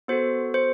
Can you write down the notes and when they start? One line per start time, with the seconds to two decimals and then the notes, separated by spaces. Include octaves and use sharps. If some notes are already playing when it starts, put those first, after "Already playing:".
0.08 B3 F#4 A4 C5
0.54 C5